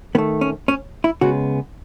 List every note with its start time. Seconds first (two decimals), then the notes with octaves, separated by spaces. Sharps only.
0.15 D#3 B3
0.18 A3
0.41 C#4
0.68 C#4
1.04 E4
1.21 C#3 G#3 B3 F#4